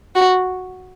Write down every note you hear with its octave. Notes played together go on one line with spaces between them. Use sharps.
F#4